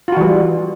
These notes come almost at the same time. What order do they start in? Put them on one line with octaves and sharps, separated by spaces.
F4 F#4 E3 G3